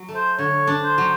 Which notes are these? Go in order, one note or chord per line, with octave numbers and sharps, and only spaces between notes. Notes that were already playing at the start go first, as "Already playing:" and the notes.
Already playing: F#3
A3
C5
D3 C#5
D4
C5
F#3